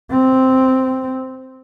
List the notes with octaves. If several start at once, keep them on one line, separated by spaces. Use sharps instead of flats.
C4